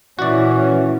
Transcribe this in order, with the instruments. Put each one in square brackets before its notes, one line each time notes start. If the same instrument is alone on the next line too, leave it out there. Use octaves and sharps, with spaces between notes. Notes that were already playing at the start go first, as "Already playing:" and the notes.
[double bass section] A#2 [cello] E3 [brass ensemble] C#4 [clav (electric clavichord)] F#4 D5